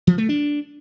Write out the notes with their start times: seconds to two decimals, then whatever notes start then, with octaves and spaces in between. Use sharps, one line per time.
0.07 F3
0.18 A3
0.29 D4